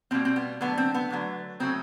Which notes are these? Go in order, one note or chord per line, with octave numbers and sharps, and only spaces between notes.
B2 G3 A#3 C4
C4
B3
D3 F#3 A3 B3
C4
B3
D3 F#3 A3
C#3 F#3 A3 C4